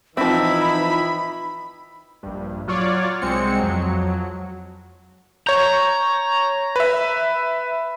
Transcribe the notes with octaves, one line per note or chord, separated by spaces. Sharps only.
E3 F3 C4 D#4 E4 B5
A#1 G2
F#3 F4 C#5 D5
C2 G#3 C4 C#7
F2 F#3
C#5 A#5 G6
B4 E5